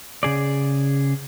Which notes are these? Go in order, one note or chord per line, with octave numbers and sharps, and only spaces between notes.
C#3 G#4 D5